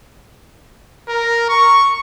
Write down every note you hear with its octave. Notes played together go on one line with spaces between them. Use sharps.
A#4
C#6